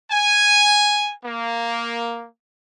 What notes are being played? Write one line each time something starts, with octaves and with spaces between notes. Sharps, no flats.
G#5
A#3